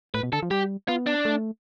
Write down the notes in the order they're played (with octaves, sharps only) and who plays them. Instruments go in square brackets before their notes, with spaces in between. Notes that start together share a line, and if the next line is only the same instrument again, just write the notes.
[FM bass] A2 [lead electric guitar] B4
[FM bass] B2
[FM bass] D3 [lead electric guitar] A4
[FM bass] F3
[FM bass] G3 [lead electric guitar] G4
[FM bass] B3 [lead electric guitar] F4
[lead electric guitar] D4
[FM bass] A3